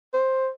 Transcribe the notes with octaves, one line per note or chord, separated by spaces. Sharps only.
C5